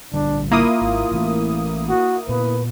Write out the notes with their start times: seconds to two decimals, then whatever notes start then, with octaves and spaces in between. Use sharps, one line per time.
0.14 A#1 D3 G3 D4
0.51 A#3 E4 F4 D#6
0.81 G#1
1.11 A1 E3 A3
1.89 F#4
2.29 A#2 B3 B4